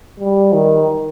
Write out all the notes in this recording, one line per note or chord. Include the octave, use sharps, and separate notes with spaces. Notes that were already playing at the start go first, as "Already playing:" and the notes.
G3
D#3